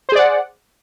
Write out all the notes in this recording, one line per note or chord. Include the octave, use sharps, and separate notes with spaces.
G#4 C5 D5 F#5